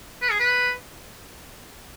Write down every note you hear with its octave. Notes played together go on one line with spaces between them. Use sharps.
B4
G#4
B4